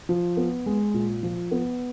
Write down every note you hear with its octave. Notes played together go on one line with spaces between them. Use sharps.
F3
B3
G#3
A#2
F3
B3